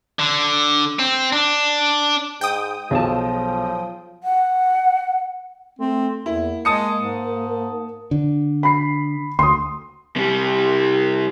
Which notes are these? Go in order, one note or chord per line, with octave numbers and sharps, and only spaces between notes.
D3
C4
D4
G#2 G5 D#6
B1 F3 F#3 G#4 A5
F#5
A3 C4
E2 A#3 E4
G#3 A5 D#6 C#7
G#2
D3
B5 C7
D2 C6 D#6
C3 G3